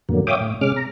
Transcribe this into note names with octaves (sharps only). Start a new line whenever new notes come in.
F2 A2 D3 F#3 A#3
C#5 E5 F5 G5 D6 D#6
A2
C3 G#3 C#4 D6 F6
A#5